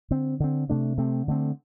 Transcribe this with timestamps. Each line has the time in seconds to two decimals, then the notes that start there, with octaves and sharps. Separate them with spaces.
0.11 D3 C4
0.40 D3 C4
0.70 C3 A3 D4
0.98 C3 A3 C4
1.28 D3 A3 C4